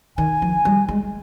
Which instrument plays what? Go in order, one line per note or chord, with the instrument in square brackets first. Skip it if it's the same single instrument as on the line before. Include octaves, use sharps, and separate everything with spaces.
[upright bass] D#3 [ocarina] G#5
[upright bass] F3
G3
G#3